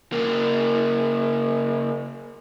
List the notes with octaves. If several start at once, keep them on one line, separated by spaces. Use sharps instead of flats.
C#3 A#3